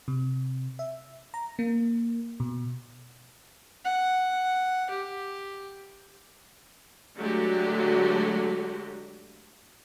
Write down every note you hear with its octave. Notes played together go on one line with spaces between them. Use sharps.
C3
E5
A#5
A#3
B2
F#5
G4
D3 F#3 G#3 A3 F#4 G4